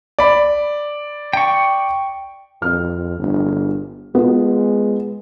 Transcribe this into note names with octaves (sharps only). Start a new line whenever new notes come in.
D5 B5
G5 C#6
F2 F6
G1
G#3 B3 F4